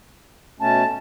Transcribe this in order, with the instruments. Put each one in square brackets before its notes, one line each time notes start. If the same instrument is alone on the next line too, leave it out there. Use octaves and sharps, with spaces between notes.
[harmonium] B2 A3 C#4 [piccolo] A5